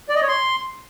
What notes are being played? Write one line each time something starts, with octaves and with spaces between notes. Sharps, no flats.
D5
D#5
C#5
C6